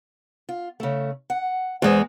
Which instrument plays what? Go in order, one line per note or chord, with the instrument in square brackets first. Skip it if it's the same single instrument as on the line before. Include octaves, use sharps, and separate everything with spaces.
[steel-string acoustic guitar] F4
C#3 A3
F#5
[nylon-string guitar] E2 G#3 [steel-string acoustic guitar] C5 D5